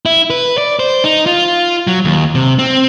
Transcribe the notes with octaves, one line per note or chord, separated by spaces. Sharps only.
E4
B4
D5
C5
D#4
F4
F#3
D#2
C3
C4